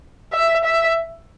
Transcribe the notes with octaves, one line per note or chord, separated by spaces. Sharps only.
E5
E5